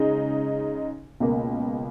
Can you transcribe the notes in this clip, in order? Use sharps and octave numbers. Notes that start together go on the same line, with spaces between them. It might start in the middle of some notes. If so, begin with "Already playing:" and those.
Already playing: C#3 G#3 D#4
C#2 B2 A#3